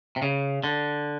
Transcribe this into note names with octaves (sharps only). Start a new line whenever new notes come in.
C3
C#3
D3